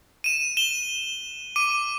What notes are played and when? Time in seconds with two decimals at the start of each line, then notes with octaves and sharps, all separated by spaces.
0.24 D#7 E7
0.57 E7 G7
1.56 D6 D#7